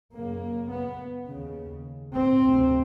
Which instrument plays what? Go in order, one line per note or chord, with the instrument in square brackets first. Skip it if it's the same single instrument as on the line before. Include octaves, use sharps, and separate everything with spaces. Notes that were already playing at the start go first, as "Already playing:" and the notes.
[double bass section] F#2 C#3 A#3
B3
D#2 C#3
C4
D2 C3